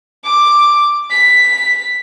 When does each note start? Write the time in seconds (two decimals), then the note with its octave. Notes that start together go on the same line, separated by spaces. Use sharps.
0.24 D6
1.11 B6